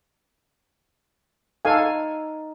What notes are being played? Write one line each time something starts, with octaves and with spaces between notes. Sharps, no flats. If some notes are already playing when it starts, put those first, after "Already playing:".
D#4 A4 F5 G#5